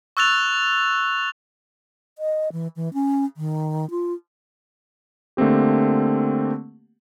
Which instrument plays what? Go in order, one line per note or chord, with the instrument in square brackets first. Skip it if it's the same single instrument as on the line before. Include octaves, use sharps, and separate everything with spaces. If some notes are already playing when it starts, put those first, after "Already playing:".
[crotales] C#6 E6 F#6 A6 F7
[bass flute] D#5
E3
E3
C#4
D#3
F4
[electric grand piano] D3 A3 A#3 C4 G4